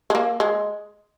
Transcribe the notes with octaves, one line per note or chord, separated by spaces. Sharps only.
G#3
A#3
G#3